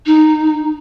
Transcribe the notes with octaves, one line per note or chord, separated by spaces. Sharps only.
D#4